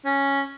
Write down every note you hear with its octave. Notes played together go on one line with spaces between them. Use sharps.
C#4